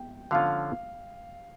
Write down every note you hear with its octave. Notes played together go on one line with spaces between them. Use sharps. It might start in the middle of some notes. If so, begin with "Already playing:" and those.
Already playing: G5
D3 F3 C#4 F4 F5